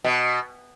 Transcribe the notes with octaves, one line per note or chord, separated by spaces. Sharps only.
B2